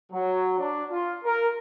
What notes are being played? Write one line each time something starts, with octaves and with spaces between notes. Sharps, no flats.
F#3
D4
F4
A#4